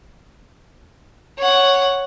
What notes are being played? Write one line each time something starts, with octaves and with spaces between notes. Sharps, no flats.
C#5 F#5